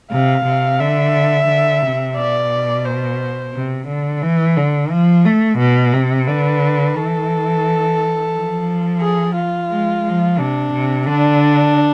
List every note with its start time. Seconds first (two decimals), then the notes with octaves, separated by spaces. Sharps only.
0.11 C3 F5
0.45 C3
0.80 D3 E5
1.48 D3
1.82 C3
2.17 B2 D5
2.85 C5
3.53 C3
3.88 D3
4.22 E3
4.56 D3
4.91 F3
5.25 A3
5.59 B2
5.93 C3
6.27 D3 B4
6.96 E3 A4
8.33 F3
9.01 G#4
9.36 F4
9.70 G#3
10.05 F3
10.39 C3 D4
10.73 C3
11.07 D3 D4